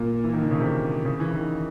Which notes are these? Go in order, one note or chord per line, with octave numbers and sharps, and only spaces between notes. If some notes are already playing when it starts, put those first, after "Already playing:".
Already playing: A#2
E3
D#3
D3
C#3
C3
C#3
E3
E3
D#3